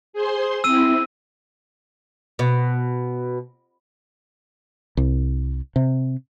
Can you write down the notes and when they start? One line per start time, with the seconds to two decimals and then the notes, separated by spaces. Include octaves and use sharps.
0.13 G#4 C5 C6
0.64 C4 E4 E6 D#7
2.39 B2
4.97 C2
5.76 C3